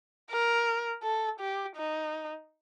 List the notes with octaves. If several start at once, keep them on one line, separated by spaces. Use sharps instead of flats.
A#4
A4
G4
D#4